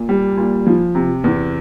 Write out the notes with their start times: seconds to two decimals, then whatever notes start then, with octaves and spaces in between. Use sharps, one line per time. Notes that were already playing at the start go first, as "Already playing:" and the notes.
Already playing: A#2
0.09 G3
0.37 A#2
0.66 F3
0.95 C3
1.24 E2